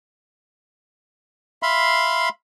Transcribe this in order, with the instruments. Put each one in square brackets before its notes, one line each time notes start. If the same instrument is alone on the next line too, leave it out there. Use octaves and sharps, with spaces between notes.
[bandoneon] E5 F5 B5 C6